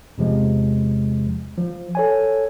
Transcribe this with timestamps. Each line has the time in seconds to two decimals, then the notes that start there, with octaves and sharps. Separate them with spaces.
0.18 E2 C3 F3 G#3
1.58 F3
1.95 A4 C#5 G#5